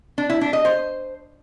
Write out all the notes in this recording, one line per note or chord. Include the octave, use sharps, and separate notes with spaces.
D4
E4
D4
D#5
C5